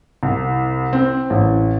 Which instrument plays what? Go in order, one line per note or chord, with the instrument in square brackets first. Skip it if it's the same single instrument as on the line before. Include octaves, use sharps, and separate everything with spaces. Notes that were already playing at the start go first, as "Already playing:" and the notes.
[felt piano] C2
C4
A1